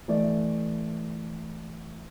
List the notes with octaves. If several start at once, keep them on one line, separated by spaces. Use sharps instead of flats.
E3 A3 D5 D#5